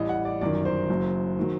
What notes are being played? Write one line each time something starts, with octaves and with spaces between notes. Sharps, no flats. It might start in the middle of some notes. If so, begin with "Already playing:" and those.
Already playing: A1 A2 G3 D#5
F#5
D5
G1 F#2 D#3 D5
C5
F#1 F#2 F#3
D#3 F#3